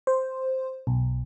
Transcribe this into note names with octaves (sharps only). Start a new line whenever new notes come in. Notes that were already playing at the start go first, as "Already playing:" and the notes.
C5
B1